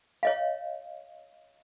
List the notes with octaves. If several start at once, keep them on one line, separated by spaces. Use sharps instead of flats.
C#5 D#5 F5